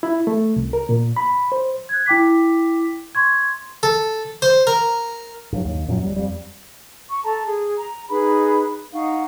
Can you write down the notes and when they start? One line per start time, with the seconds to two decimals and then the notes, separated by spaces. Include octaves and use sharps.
0.03 E4
0.27 A3
0.56 C2
0.73 A#4
0.89 A#2
1.17 B5
1.52 C5
1.89 F#6 G#6
2.06 E4 G5 D6 B6
3.15 C6 C#6 G#6
3.83 A4
4.42 C5
4.67 A#4
5.52 G2 F#3
5.65 D#2
5.88 F#2 A#2 C#3 F#3
6.03 D1 G3
6.16 F2 G3
7.10 C#6
7.24 A4 A5 A#5
7.45 G#4
7.77 A#5
8.10 D#4 G#4 B4 B5
8.93 D#4 F5 F#5 C#6